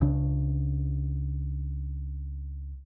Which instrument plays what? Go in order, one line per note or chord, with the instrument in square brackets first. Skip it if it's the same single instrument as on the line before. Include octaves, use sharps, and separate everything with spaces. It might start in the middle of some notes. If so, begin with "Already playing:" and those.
[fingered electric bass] C#2 C#3 D4